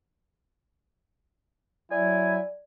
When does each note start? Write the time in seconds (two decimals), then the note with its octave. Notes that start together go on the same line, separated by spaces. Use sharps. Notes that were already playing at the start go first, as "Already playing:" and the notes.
1.91 F#3 E4 D5 G#5